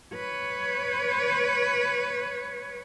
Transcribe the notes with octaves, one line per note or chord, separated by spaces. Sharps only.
B4 C#5